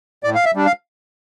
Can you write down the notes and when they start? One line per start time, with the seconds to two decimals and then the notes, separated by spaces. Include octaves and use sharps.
0.24 A2 D5
0.35 F5
0.45 E5
0.55 G3 D4
0.66 F5